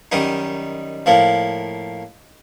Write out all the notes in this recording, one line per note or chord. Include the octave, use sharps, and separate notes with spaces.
F#2 D#3 G3 D#4
A2 F3 A#3